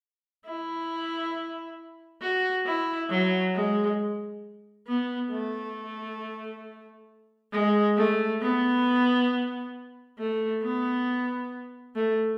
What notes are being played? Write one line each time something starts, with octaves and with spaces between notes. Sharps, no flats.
E4
F#4
E4
F#3
G#3
B3
A3
G#3
A3
B3
A3
B3
A3